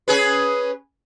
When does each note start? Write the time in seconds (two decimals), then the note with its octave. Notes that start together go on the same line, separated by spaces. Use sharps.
0.08 C#4 G#4 B4